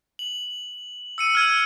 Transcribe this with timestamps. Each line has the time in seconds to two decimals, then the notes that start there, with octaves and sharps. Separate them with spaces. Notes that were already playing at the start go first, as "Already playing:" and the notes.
0.19 F#7
1.18 E6 C#7 D#7
1.35 F6 G#6 D#7